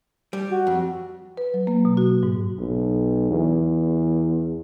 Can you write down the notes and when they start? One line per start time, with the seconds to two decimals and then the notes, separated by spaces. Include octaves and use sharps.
0.33 G3
0.50 F#4
0.67 F2
1.37 B4
1.54 F#3
1.67 A#3
1.85 B2
1.97 F#4
2.23 G#2
2.59 B1
3.31 E2